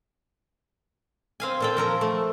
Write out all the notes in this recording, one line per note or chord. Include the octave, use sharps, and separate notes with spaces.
C4 F5 G#5
A#2 A4 G5
F3 A#4 A#5
A3